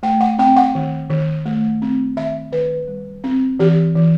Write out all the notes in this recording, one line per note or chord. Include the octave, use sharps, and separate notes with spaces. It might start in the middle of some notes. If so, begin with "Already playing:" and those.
A3 G5
F#5
C4 G5
F#5
D#3
D#3
A3
C4
D#3 E5
D#3 B4
G3
C4
E3 G4
E3